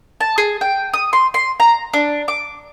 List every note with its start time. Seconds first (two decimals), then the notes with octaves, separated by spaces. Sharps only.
0.20 A5
0.38 G#4
0.61 G5
0.94 D#6
1.13 C6
1.34 C6
1.60 A#5
1.93 D4
2.28 D6